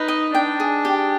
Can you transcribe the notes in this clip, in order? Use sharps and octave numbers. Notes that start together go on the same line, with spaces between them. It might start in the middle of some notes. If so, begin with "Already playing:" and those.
Already playing: D#4 B4
D#5
D4 G5
G#4
G4